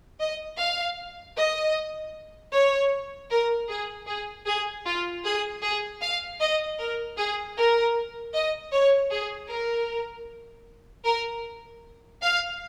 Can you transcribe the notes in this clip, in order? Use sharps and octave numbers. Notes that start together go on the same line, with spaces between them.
D#5
F5
D#5
C#5
A#4
G#4
G#4
G#4
F4
G#4
G#4
F5
D#5
A#4
G#4
A#4
D#5
C#5
G#4
A#4
A#4
F5